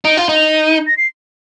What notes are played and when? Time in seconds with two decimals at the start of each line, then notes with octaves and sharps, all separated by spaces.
0.05 D#4 D7
0.17 F4
0.29 D#4
0.36 F7
0.66 D#7
0.87 A#6
0.97 C7